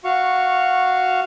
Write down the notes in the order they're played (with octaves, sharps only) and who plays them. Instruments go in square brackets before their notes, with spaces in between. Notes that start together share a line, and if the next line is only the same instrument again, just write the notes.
[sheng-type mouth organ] F#4 F5 C#6